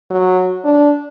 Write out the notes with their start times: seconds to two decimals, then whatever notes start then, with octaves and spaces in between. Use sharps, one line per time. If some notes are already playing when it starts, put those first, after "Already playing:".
0.11 F#3
0.65 D4